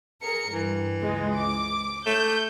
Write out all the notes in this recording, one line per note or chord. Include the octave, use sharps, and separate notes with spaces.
G#4 A#4 C#7
G2 E3
C#2 G#3
D6
A3 G6